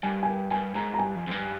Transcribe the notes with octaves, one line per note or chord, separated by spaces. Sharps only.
G2 G#5
G#5
G5
G2 G#5
G#2 A#5
A#5
G2 G#5
F2
F2
G2